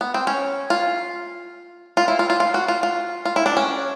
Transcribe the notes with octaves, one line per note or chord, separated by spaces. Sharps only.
B3
C4
C#4
F4
F4
E4
F4
F4
F4
F#4
F4
F4
F4
E4
D4
C#4